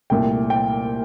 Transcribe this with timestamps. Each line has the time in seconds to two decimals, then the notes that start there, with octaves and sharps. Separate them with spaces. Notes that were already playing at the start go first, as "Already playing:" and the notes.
0.10 C2 A#2 A3 E4 G5
0.50 G5